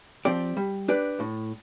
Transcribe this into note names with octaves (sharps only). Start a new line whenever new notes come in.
F3 C4 G4 D5
G3
D4 G4 B4 D5
A2